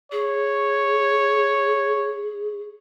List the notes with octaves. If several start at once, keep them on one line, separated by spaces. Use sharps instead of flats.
G#4 C#5